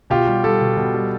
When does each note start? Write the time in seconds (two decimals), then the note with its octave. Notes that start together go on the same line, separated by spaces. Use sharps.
0.10 B2 F4 G4
0.27 G3
0.44 G3 G4 A4
0.61 B2
0.77 B2
0.94 G3